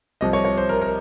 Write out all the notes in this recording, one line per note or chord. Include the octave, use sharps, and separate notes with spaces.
C2 C3 F3 D#5
C#5
C#5
C5
A#4
A#4